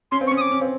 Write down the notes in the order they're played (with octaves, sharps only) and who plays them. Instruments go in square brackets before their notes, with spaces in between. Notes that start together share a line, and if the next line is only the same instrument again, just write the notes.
[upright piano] C#4 [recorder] C6
[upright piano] C4
[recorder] C#6
[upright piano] C#4
[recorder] D#6
D6
[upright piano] C#4
C4